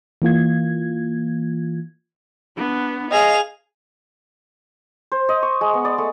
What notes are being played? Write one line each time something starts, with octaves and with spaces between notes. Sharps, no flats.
E3 A#3 F4 G#6
B3 D4
G#4 D#5 F5 F7
C5
D#5
C#6
G#3
B3
D5
A3